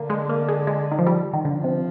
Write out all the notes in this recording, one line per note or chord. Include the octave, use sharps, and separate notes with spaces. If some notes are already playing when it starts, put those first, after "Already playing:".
Already playing: D3 A#3
G#3
A#3
G#3
G#3
D#3
F3
G3
D#3
D3 F3
C3